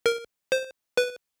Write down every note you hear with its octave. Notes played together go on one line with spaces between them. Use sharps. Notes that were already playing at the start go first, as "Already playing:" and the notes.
A#4
C5
B4